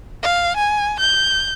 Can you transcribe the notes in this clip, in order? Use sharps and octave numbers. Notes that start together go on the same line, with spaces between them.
F5
G#5
G6